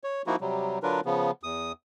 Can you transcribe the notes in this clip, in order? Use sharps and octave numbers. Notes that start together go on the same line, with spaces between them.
C#5
F3 A#3 D#4 E4 F#4
C3 F#3 G3
D3 F#3 D4 F4 A#4 B4
C#3 F3 B3
E2 D#6